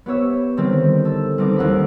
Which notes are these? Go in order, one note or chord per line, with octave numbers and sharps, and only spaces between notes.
B3 G4 C#5 E5
D3 D#3 G3 C4 G4
A4
G3 B3 C4 D#4 D6
D#2 F#5 B5